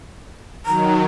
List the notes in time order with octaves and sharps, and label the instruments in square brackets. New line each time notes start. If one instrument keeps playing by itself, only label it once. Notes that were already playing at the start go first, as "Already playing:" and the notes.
[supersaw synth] D#3 F#3 [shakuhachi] A#5